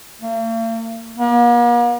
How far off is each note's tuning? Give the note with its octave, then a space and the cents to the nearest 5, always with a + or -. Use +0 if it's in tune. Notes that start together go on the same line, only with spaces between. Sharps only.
A#3 -45
A#3 +45